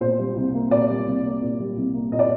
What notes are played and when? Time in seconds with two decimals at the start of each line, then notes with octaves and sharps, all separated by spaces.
0.01 A#2 C5
0.19 G3
0.36 C2
0.54 A#3
0.71 A#2 D5
0.89 G3
1.07 C2
1.25 A#3
1.42 A#2
1.60 G3
1.77 C2
1.94 A#3
2.12 A#2 D#5
2.19 D5